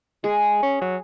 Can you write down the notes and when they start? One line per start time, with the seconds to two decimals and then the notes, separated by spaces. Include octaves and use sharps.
0.24 G#3 G#4
0.63 C#4
0.81 F#3